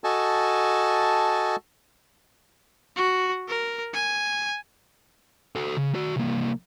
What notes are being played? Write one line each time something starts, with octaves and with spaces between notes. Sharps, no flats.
F#4 A4 D#5 G#5 A5
F#4
A#4
G#5
F#4 A4
C#3
F#4 D5
C2 A#3